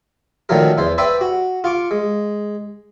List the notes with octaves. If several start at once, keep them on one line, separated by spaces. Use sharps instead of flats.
A#2 D#3 F3 F#3 A3 A#4
E2 E3 C5
B4 C5 D5 E5 G5 G#5
F#4
F4 C#6 D6
G#3